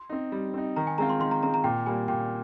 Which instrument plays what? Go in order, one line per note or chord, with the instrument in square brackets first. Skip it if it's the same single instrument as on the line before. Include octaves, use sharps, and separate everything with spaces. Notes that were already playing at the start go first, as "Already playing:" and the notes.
Already playing: [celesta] C6
[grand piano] C4 D#4
G3
C4 D#4
[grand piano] D#3 [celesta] A#5
[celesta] G#5
[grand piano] G#3 C4 F4 [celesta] A#5
[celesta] C6
[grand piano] D#3 [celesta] C6
[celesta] A#5
[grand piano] G#3 C4 F4 [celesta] A#5
[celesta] A#5
[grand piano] A#2 [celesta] G5
[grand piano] G3 A#3 [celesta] G#5
[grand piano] A#2 [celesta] G5